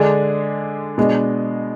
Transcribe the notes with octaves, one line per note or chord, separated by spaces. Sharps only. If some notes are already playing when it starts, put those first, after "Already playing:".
Already playing: D3 G#3 D4 G#4
B2 G#3 D4